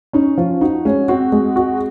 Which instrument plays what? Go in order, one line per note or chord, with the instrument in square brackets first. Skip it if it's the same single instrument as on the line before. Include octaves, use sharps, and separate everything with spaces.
[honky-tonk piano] C#4 [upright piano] D#4
[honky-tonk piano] F3 [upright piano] F4
[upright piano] D#4 [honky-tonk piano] F#4
[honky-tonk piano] G#3 [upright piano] C#4
[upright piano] C4 [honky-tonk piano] F#4
[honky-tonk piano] G#3
F#4